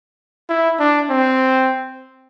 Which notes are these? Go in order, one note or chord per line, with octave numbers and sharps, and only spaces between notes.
E4
D4
C4